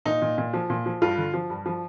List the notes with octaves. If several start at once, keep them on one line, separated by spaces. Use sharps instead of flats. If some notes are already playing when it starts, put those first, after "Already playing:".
A#2 D#4
A#2
A#2
F3
A#2
F3
G2 F4
D3
F3
G2
F3